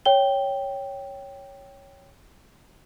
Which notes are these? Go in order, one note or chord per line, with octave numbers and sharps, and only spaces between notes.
C#5 G5 G7